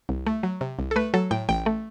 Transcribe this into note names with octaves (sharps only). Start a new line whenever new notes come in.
C2
A3
F#3
C3
C2
A4
A3 B4
F#3 A4
A2 G5
A1 G5
A3